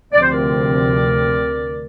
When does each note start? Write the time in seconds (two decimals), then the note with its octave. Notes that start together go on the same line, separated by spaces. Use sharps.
0.13 D2 C3 F3 C4 D5
0.22 C5
0.30 A#4 D5